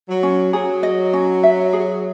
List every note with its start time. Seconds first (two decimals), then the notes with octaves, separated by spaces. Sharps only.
0.09 F#3
0.23 C#4
0.53 F#3 G#4
0.83 D#5
1.13 C#4
1.44 E5
1.73 G#4